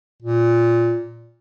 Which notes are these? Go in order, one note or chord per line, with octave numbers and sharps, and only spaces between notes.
A#2